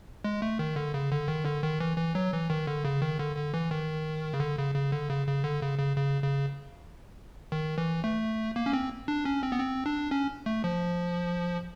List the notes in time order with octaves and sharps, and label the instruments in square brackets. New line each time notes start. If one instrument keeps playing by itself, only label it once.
[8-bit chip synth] G#3
A3
D#3
D3
C#3
D3
D#3
D3
D#3
E3
E3
F#3
E3
D#3
D3
C#3
D#3
D3
D3
E3
D#3
C#3
D3
C#3
C#3
D3
C#3
C#3
D3
C#3
C#3
C#3
C#3
D#3
E3
A3
A#3
C#4
C4
D4
C#4
C4
B3
C4
D4
C#4
A3
F3